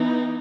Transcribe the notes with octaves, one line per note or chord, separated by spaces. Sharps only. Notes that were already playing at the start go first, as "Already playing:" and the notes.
Already playing: E3 B3 D#4